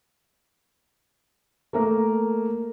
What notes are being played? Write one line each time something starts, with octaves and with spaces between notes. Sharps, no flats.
A3 A#3 A#4